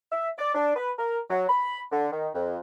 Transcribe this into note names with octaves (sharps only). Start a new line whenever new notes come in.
E5
D5
D4
B4
A#4
F#3
B5
D3
D#3
F2